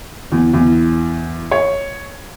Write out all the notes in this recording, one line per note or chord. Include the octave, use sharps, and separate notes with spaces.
E2
E2
C#5